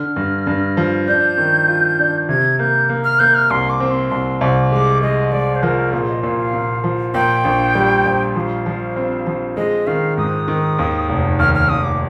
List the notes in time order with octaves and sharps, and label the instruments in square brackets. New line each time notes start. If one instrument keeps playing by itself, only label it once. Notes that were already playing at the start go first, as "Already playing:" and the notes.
Already playing: [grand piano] D3 [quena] F6
[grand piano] G2
G2
F3
[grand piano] D4 [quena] G6
[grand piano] D#3
F4
D4
[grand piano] C3 [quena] G#6
[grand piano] A#3 [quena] G6
[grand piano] A#3
[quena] F6
[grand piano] A#3 [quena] G6
[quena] F6
[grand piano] C2 [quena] C6
[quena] D6
[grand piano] C4
[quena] C6
[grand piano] C2 [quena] C6
[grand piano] C2 [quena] D6
[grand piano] G#3 [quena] D6
[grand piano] G#3 [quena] D#5
[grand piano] G#3 [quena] D5
[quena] C5
[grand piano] F3 [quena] A#4
[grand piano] A#2 [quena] G#4
[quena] D#5
[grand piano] A#2 [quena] F5
[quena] F5
[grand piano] A#2
F3
[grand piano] A#2 [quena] G5
[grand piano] A#1
G3
A#1
[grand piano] F3 [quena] F5
[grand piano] F3
C4
F3
[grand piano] G#3 [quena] D#5
[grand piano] D#3 [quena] F5
[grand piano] G#2 [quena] D#6
[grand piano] D#3
D#2
F1
[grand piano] D#2 [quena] F6
[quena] F6
[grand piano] D#2 [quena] D#6
[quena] D6